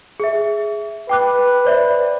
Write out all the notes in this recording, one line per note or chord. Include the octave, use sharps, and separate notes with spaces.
G#4 E5
B4 G5 D6 F#6
C5 D5 E5